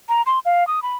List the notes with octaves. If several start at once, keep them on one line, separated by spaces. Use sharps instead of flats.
A#5
C6
F5
D#6
B5